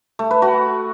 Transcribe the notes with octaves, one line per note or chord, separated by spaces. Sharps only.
A3
B4
F#4